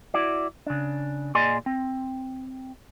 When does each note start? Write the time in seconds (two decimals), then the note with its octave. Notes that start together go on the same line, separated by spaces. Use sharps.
0.14 E4 F#4 D5
0.67 C#3 D4
1.35 A#2 G#4 D5 D#5 G#5 C6
1.66 C4